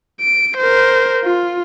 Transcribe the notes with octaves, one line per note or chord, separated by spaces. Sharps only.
D7
A#4 C5
F4